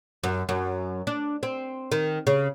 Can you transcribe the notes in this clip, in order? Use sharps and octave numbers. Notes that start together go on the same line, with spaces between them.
F#2
F#2
D4
C4
D#3
C#3